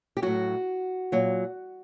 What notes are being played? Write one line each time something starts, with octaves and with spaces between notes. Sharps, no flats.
G4
A2 F#3 F#4
A#2 F#3